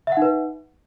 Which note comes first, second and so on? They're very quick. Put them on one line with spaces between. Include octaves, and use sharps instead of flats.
E5 F#5 D#4 B4